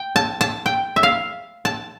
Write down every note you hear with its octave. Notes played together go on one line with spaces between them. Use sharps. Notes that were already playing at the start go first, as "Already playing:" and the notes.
Already playing: G5
A5
A5
G5
E5
F5
A5